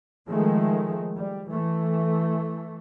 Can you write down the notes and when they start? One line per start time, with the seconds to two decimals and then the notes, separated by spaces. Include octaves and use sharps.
0.29 D#3 F3 G#3 A3
1.16 G3
1.51 E3 A3